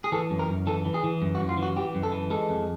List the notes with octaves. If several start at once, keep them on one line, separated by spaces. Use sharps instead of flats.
G#4
E3 A4
F#2
A#4
F#2
E3 A4
E3
G#4
E3
F#2
F#4
F#2
F4
E3 F#4
E3 G4
F#2
A4
E3
G#3 A4
F2